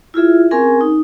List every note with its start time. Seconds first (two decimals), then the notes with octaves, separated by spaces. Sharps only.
0.14 E4 F4 G#4 E5
0.51 C4 C#4 G#4 A#4 G#5
0.81 D#4